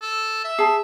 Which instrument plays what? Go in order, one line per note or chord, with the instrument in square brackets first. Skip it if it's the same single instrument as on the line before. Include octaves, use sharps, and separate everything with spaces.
[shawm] A4
E5
[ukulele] G#4 A5